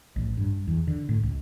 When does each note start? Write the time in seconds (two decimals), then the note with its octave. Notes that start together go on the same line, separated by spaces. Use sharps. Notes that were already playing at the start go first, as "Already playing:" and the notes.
0.16 A1
0.37 G2
0.67 E2
0.87 D3
1.09 A2
1.23 C#2